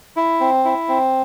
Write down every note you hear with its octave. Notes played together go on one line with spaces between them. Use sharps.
E4
C4
E4
C4